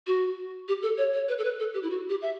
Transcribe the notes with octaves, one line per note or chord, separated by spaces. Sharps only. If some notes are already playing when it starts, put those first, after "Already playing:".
F#4
G4
A4
C#5
C#5
B4
A4
B4
A4
G4
E4
F#4
G4
E5